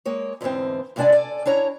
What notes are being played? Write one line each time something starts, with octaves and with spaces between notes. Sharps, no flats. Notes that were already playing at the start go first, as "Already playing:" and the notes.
G#3 A#3 C#5
E2 G#2 D3 E3 C4
G2 C3 G#3 D4 D5 G#5
A4 D5 G#5
D4 E4 C#5 A#5